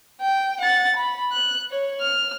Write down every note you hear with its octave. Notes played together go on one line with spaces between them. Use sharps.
G5
F#5 A6
B5
F#6
C#5
F6